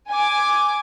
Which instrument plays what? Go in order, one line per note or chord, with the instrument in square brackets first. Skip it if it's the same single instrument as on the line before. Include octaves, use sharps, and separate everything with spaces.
[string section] G#5 D6